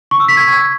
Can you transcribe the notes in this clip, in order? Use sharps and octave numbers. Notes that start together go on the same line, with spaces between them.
C#6
E6
B6
G#6